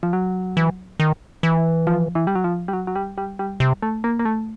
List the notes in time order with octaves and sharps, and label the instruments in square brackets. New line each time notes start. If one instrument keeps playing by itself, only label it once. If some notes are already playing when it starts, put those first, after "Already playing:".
[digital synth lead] F3
F#3
[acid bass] E3
D#3
E3
[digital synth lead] F3
E3
G3
F#3
F3
G3
F#3
F#3
G3
G3
G3
[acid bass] C3
[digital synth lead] A3
A#3
A#3
A3